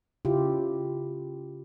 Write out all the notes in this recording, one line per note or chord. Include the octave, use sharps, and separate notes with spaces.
C#3 E4 F4 G4